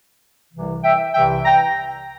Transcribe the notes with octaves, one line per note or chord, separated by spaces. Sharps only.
C2 C3 E3
E5 G5
C2 C3 E3 G3 E5 G5
G5 A#5